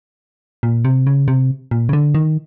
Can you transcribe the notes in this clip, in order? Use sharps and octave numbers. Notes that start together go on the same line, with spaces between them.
A#2
C3
C#3
C3
A#2
C#3
D3
D#3